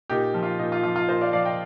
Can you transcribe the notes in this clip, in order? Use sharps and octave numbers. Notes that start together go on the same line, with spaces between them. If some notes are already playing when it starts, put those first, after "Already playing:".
A#2 D#4 G4
F3
F4
A#2 D#4
F4
F3 F4
F4
A#2 C5 D#5
D5 F5
F3 D5 F5
D#5 G5